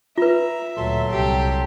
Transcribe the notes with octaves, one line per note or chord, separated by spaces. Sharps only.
F4 B4 E5 A#5
D2 A#2 F#3 A4 C6
C2 G4